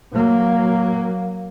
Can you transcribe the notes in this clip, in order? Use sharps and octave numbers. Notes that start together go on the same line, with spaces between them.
F#3 A#3